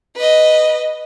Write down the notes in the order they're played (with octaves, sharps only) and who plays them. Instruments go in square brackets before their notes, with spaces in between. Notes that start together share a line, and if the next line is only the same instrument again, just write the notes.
[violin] B4 D#5